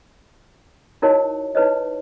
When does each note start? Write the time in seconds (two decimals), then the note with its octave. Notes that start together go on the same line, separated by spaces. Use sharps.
1.02 D#4 E4 F#4 A#4 C#5 D#5
1.55 D#4 E4 B4 C#5 D#5